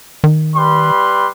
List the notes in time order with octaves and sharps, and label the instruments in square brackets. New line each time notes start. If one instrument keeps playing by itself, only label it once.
[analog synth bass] D#3
[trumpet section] G3 B4 C6